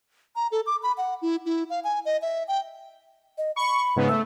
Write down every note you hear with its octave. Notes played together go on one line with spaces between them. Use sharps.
A#5
A4
D6
B5
F#5
E4
E4
F5
G#5
D#5
E5
G5
D#5
B5 C#6
G#2 C#3 B3
A3 E6